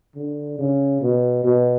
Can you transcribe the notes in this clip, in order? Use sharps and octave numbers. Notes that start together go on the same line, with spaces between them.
D3
C#3
B2
B2